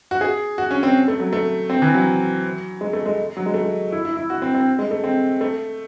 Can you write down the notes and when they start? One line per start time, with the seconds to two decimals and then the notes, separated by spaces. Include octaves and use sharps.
0.11 F#4
0.21 G#4
0.58 F#4
0.71 C#4
0.83 C4
1.08 A3
1.20 F#3
1.33 A3
1.70 C4
1.82 E3
1.94 F#3
2.81 G#3
2.93 A3
3.06 G#3
3.37 F#3
3.46 G#3
3.54 A3
3.62 G#3
3.92 E4
4.05 E4
4.17 E4
4.30 F#4
4.42 C4
4.55 C4
4.79 G#3
4.91 A3
5.04 C4
5.41 A3